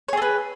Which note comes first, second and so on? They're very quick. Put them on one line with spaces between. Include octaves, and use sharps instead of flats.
C#5 G#4 A4 B4